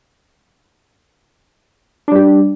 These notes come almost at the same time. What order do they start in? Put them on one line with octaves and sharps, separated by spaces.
D4 G3 G4